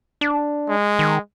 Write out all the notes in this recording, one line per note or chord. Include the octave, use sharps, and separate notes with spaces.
D4
G#3
D#3